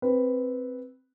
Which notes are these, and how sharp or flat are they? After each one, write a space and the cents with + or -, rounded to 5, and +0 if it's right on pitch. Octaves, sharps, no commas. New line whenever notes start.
C4 +0 B4 +0